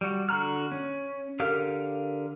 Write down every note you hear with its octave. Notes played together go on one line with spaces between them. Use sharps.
G3 F#4
D3 F#4 A#5 F6
C#4
D3 G4 A#4 F5 F6